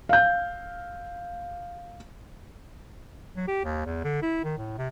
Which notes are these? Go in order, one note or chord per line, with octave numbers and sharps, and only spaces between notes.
F5 G6
F#3
G4
D#2
E2
D3
E4
D#3
A2
C3